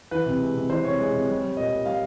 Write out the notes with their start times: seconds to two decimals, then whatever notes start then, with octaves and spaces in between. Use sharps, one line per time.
0.11 E3 B4
0.26 C3
0.40 G#3
0.55 C3
0.70 E3 C5
0.84 C3 C#5
0.98 G#3
1.13 C3
1.28 G3
1.42 G3
1.56 A#2 D#5
1.71 A#2
1.86 G3 F5